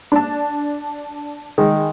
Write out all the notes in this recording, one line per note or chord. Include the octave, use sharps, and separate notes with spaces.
D4 A5
D#3 G#3